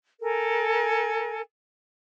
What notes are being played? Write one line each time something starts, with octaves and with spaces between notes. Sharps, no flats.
A4 A#4 G#5